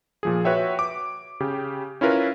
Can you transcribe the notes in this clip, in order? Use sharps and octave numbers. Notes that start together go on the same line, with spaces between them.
A#2 F3 G#4
F#4 B4 C#5 E5 G5
D6
C#3 G4
C#4 E4 F4 A#4 B4